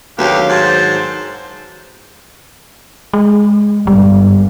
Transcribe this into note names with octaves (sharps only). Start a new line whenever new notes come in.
D2 D#3 F#3 B3 G4 F5
G#2 C5 A5
G#3
G1 G3